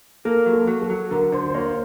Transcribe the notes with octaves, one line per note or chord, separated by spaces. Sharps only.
A#3 A4
F#3
A4
F#3
A4
F#3
D3 A#4
D3 C5
C5
A#3 C#5
C5